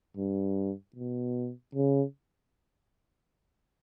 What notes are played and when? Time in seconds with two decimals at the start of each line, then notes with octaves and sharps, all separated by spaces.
0.17 G2
0.96 B2
1.75 C#3